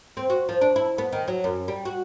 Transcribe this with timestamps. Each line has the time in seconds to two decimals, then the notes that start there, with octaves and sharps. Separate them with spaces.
0.17 C4
0.30 F#4
0.49 F3
0.61 D4
0.76 E4
0.98 B3
1.12 D#3
1.28 F#3
1.44 F#2
1.68 G3
1.85 F#4